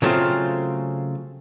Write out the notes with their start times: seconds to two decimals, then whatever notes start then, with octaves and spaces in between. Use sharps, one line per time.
0.02 C#3 F#3 A3 C4 F4